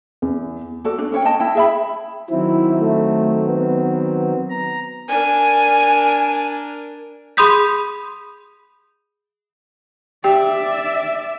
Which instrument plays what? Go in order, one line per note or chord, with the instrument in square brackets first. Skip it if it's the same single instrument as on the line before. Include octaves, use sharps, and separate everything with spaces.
[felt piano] E2
[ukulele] F#4 A4 D5
D4
C#4 C#5 G5
D#5 G5 A5
E4 G5
G#4 E5 B5
[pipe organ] D#3 F#3 C4 [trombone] E4
[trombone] A3
B3
[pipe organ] A#5
[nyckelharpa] D4 A#4 [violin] G#5
[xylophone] G#4 B5 C6 D#6 G6 B6
[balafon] G4 G5 [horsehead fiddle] D5 E5